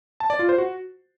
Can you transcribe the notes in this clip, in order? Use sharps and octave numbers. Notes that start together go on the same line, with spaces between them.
A5
D5
F4
C5
F#4